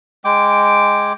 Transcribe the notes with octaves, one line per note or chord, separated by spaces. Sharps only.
G#3 G5 D6